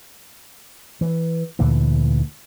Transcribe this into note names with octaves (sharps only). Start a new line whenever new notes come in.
E3
D2 A#2 D3 E3